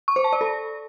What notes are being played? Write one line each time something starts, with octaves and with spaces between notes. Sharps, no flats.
C#6
C5
A5
D5
A4